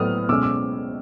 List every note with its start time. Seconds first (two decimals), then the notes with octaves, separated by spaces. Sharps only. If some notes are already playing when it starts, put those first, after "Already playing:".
Already playing: A2 F#3 B3 D#6 F6
0.29 B2 G#3 C#4 D6 E6
0.43 D6 E6